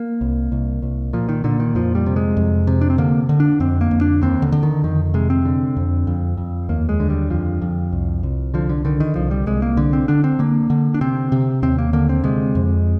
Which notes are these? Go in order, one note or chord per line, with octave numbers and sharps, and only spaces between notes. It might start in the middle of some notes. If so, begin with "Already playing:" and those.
Already playing: A#3
C2
C2
C2
A#2 F3
D#3
A#2 D3
D#3
F2 F3
G3
C3
G#3
F2
C3
D4
C4
D3 A#3
D3
D4
F2 C4
A#3
F2
D4
D#2 C4
D3
D3
D#3
F2 D#3
C3 G#3
C4
D3
F2
F2
F2
D#2 A#3
G#3
D3
G3
F2 F3
F2
C2
C2
D3 F3
D3
D3 D#3
D#3
C2 F3
G3
C2 G#3
A#3
D3
C4
D3 D4
C4
D3 A#3
D3
D4
C3 C4
C3
D#2 C4
A#3
D3 A#3
C4
C3 G#3
F2